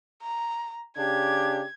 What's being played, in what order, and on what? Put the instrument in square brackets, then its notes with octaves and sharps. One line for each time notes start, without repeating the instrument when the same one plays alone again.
[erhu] A#5
[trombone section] C#3 D4 G4 [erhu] G#6